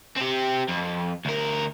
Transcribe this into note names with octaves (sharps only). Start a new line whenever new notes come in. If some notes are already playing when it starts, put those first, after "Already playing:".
C4 G4
F2
D2 A#4